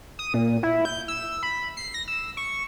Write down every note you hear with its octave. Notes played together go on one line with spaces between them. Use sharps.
D#6
A#2
E4
G6
E6
B5
C7
A#6
E6
C#6